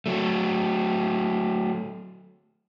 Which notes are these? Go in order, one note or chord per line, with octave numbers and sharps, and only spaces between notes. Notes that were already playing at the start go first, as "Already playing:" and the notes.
F#3 A3